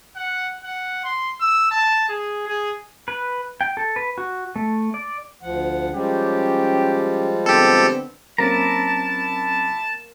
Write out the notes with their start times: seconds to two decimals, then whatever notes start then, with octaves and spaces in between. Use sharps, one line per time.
0.16 F#5
0.64 F#5
1.04 C6
1.41 E6
1.71 A5
2.09 G#4
2.47 G#4
3.08 B4
3.61 G5
3.77 A4
3.96 B4
4.18 F#4
4.56 A3
4.94 D5
5.42 D2 F3 F#5
5.93 F3 G3 G#3 C#4 G4
7.46 D3 B3 C4 G4 A4
8.38 F#3 A#3 C4 C#4 E4 D5 A5 A#5